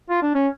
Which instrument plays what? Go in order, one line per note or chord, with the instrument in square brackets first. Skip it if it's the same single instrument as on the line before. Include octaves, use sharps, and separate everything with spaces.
[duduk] F4
D4
C#4